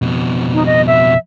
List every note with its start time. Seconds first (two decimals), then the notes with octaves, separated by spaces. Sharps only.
0.02 F2 B2
0.54 D#4
0.66 D#5
0.87 E5